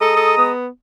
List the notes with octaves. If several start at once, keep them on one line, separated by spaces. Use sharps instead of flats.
G#3 A4 A#5 D#6
A4
B3